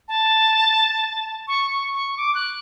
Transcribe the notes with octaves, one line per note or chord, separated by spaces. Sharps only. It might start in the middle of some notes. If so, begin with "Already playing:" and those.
A5
C#6
C#6
C#6
D6
F#6